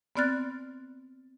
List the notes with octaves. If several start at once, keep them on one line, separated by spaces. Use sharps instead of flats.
B3 C4 D5 F6 F#6 A6